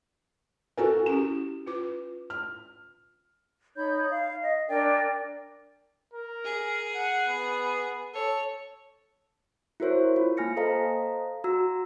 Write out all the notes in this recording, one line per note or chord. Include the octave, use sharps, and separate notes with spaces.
F#4 A4 A#4 G#5
C#4 E4 G4 E7
F4 B4 D6
F6
D#4 C#5 B5 G6
F5
D#5
D4 A#4 D5 G5
A#4
G#4
F#5
B3
A4 C#5
E4 F#4 A#4 C5 C#5
F4
A#3 F4 G#5 F6 A#6 C#7
A4 C5 D#5 F5 A#5
F#4 A#5 E6